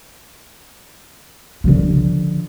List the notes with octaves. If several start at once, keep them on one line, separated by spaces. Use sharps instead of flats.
D3 F3